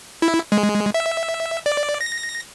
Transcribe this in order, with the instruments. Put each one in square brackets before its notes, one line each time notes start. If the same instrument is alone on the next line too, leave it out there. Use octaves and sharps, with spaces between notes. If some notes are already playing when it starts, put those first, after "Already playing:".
[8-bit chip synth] E4
G#3
E5
D5
A#6